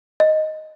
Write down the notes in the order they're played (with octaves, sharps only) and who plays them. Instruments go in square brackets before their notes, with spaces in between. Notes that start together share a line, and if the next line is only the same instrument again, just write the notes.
[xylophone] D#5